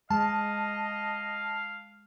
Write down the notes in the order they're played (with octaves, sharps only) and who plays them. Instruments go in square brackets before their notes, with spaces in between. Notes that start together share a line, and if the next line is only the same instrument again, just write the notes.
[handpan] G#3 [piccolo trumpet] D#5 [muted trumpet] F5 [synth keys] A5